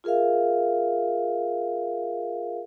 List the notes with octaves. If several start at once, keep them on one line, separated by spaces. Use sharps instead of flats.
F4 G#4 A#4 E5 F5